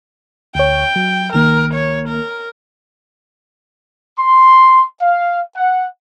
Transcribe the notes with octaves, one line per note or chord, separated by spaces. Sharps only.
D2 C#5 G5
F#3
C2 D#3 A#3 A#4
C#5
A#4
C6
F5
F#5